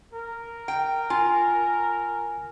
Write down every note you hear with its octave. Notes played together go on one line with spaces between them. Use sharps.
A#4
G5
F4 G#5